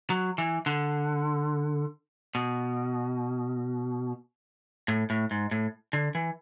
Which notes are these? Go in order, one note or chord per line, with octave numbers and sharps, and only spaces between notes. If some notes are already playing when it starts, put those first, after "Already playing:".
F#3
E3
D3
B2
A2
A2
G#2
A2
D3
E3